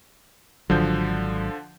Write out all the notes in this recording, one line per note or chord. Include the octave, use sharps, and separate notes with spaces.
G#1 D3 F3 F#3 G6